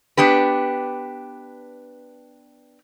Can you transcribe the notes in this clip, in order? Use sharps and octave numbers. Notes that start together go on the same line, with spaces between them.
B3 D4 G4 B4